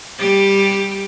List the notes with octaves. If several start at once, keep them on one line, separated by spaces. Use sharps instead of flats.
G3 G4